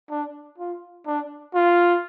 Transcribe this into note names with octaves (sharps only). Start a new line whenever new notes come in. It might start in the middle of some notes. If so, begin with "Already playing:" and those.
D4
F4
D4
F4